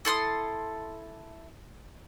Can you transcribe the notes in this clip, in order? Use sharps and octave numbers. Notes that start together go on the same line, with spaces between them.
E4 A4 C6 D#6